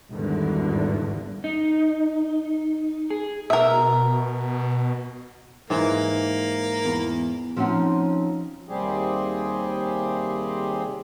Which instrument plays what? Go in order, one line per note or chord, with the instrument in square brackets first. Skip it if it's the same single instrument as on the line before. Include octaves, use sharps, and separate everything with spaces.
[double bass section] G#1 E2 G2 D3
[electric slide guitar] D#4
G#4
[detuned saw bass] B2 [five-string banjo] A#4 E5
[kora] G#2 E3 [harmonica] A#3
[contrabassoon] E2
[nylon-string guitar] F3 C4 C#4 D#4 F#5
[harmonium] D#2 C3 G3 C4 G4 G#4